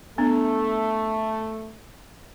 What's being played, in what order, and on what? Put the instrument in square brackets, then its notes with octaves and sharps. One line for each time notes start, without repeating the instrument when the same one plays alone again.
[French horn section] A3 [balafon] B3 D4